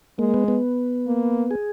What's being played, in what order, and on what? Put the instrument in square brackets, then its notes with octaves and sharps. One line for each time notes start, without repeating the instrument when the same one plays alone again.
[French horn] G#3 [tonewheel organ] A#3
[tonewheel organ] B3
B3
[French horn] A#3
[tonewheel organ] G#4